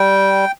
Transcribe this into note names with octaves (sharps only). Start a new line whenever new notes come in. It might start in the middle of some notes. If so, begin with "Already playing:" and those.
Already playing: G3 G5